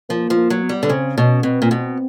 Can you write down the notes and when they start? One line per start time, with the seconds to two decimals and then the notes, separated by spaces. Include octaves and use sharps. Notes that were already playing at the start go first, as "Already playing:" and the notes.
0.09 F3 A#3
0.30 F3
0.37 A#3
0.50 F#3
0.63 B3
0.69 G3
0.83 D3
0.89 C#3 C4
1.17 B2 C#4
1.43 B2 C4
1.62 A#2
1.71 B2